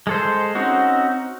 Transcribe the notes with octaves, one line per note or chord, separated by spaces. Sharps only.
G#3 A4 C5
C4 C#4 D#4 F#4